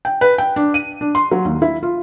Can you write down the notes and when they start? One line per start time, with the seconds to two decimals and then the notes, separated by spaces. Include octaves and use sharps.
0.05 G5
0.21 B4
0.38 G5
0.56 D4
0.74 D#7
1.01 D4
1.15 C6
1.31 F#3
1.45 D#2
1.62 E4
1.83 F4